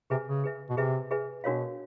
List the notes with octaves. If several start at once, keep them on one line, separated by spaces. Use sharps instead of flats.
C3 G#4 B4 E5 G#5
C#3
G#4 B4 E5 G#5
B2
C3 G#4 B4 E5 G#5
G#4 B4 E5 G#5
B2 D4 F#4 A#4 C#5 F5